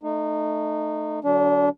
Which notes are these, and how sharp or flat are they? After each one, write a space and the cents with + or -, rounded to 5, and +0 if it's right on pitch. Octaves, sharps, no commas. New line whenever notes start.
A3 +0 D#4 -25
D3 +0 F#3 +15 D4 -30